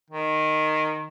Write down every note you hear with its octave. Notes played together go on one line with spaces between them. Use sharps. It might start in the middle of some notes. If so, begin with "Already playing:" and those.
D#3